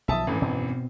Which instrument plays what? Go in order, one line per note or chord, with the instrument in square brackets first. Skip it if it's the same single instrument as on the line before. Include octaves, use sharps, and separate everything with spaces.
[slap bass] B1 D#3 F3 [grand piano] E5 A5 D#6
[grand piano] G#1 F#2 E3 [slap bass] A3
[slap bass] B2 C4